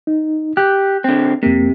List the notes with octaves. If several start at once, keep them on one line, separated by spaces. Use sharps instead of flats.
D#4
G4 F#6 G6
D3 C4
F2 C3 A#3